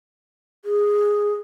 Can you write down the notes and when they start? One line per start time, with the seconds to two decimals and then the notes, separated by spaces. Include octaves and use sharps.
0.65 G#4